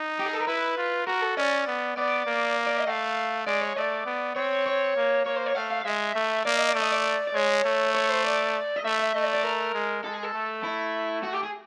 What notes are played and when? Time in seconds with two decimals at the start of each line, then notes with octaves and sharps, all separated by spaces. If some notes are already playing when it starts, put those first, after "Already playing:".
Already playing: D#4
0.19 G4
0.26 G#4
0.33 A4
0.40 A#4
0.47 E4 B4
0.78 F4
1.07 F#4 A#4
1.22 A4
1.37 C#4 D5
1.67 B3
1.97 B3 D5
2.26 A#3
2.66 D5
2.77 D#5
2.87 A3 F5
3.46 G#3 D5
3.61 C#5
3.76 A3 D5
4.06 B3
4.36 C4 C#5
4.66 C#5
4.96 A#3
5.25 A#3 C#5
5.36 C5
5.46 C#5
5.55 A3 F5
5.71 F5
5.81 F5
5.85 G#3 E5
6.15 A3
6.45 A#3 D5
6.57 D#5
6.69 D5
6.75 A3
6.80 D#5
6.92 D5
7.28 D5
7.35 G#3 C#5
7.65 A3
7.95 C#5
8.10 C5
8.24 D5
8.76 D#5
8.85 A3 E5
8.99 E5
9.15 A3 D#5
9.24 D5
9.34 D5
9.44 A#4
9.74 G#3
10.04 G#3 A4
10.13 G#4
10.23 A4
10.34 A3
10.64 E4
11.23 F#4
11.33 G4
11.43 G#4